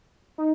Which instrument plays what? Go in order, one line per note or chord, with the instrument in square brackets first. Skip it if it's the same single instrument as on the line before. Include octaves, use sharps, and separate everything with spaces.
[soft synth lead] D#4